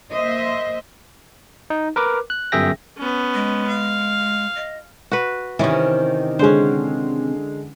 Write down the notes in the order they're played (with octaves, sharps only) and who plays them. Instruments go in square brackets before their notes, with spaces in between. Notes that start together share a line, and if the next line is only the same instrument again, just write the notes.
[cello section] A#3 C5 D#5 E5
[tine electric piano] D#4
A#4 B4 D6
F#6
G1 F#2 G#4 E5 G5 A#6
[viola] B3 C#4
[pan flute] G#3
[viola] F5
[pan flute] D#5
[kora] F#4 B4
[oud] C3 D#3 [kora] E3 C#4
[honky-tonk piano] D3 G#3 [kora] C#4 C5